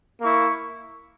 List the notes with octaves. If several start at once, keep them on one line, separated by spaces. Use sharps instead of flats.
A#3 E4 C#6